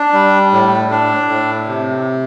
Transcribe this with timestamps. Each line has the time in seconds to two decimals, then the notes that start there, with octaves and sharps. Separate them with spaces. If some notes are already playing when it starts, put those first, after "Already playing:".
Already playing: D4
0.13 G3
0.52 A2
0.91 D4
1.29 A2
1.67 C3